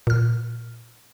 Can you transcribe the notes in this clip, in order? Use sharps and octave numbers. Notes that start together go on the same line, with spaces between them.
A#2 F6